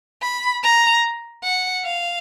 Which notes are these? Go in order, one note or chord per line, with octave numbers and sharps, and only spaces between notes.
B5
A#5
F#5
F5